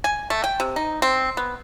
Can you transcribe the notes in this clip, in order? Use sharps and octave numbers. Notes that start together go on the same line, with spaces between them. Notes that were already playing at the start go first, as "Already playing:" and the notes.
G#5
A3
G5
C3
D#4
C4
B3